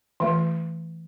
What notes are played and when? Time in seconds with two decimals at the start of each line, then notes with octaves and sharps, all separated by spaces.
0.20 E3 A3